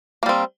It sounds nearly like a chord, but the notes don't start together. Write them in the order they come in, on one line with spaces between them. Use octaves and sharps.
A#3 G3 C4